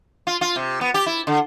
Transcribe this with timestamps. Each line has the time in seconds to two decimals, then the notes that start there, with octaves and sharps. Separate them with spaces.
0.27 F4
0.41 F4
0.56 C3
0.81 B3
0.94 G4
1.06 E4
1.27 D3